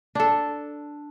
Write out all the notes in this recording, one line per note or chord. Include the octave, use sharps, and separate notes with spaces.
D4 A4